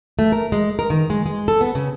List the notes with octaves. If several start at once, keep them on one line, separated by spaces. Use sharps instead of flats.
A3
A#4
G#3
A#4
D#3
G#3
G#3
A4
B3
C#3